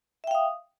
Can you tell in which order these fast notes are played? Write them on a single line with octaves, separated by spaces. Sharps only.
E5 G5 F5 D#6